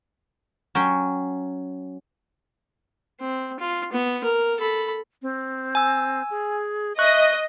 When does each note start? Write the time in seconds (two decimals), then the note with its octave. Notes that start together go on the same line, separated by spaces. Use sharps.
0.75 F#3 C#4 G5
3.20 C4
3.60 F4
3.92 B3
4.23 A#4
4.59 A4 B5
5.22 C4
5.75 G#5 E6
6.30 G#4
6.99 D#5 E5 C#6 F#6